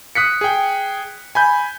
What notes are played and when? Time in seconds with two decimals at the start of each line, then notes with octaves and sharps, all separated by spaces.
0.15 D#6 F#6 B6 C#7
0.41 G#4 G5
1.35 G#5 B5 G6